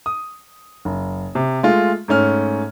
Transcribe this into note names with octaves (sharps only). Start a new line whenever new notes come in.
D#6
F#1
C3
G#3 A3 F4
G#2 A3 C#4 F6